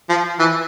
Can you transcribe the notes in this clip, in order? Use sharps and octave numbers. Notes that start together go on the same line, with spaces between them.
F3
E3